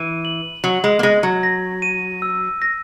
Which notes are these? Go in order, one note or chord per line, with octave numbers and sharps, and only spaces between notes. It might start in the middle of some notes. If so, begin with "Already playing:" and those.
Already playing: E3 D#7
F#7
F#3 F#7
G#3
A#3
G#3 A#6
F#3
A#6
D#7
E6
A#6